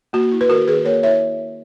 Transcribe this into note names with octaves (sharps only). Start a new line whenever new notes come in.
A#3 F#4
E4
B4
D#3 F#4 A#4
D#3 G#4 B4
A#3 A#4 C#5
E4 C#5 E5